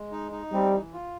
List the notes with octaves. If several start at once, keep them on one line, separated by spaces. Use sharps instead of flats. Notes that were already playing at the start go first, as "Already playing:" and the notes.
Already playing: G#3
D#4
D#4
G3 C4
E3
F4